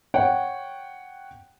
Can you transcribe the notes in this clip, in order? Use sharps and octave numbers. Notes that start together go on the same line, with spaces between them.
C#5 F#5 G5